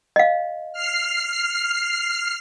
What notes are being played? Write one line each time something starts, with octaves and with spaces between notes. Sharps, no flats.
D#5 F5
F6 C7